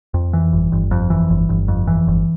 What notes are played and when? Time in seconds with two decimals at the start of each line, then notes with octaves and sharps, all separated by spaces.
0.14 F2
0.33 E3
0.53 G1
0.72 G1
0.91 F2
1.10 E3
1.30 G1
1.49 G1
1.68 F2
1.87 E3
2.07 G1